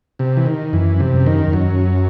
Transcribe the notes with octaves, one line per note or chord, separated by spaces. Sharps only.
C3
E3
D#3
F#2 E3
C3
F#2
D#3
E2
F#2 F#3